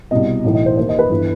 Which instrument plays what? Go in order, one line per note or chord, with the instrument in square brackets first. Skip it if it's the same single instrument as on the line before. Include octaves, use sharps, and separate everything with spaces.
[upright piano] C2 B2 D#5
B1 A2 E3
D#5
C5
D#2 D#3 C5
D#5
B4
G1 E3